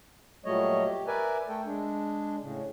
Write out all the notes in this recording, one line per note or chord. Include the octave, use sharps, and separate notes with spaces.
A#2 F#3 G3 A3 C#5 D#5
G4
A#4 B4 D5 E5 G#5
A3 A4 G5
G#3 D4
A2 C#3